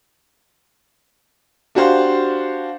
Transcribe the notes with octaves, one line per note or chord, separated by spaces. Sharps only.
D4 F#4 G4 C5 F5